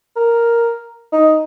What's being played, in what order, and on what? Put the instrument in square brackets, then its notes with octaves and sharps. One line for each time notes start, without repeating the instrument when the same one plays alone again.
[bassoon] A#4
D#4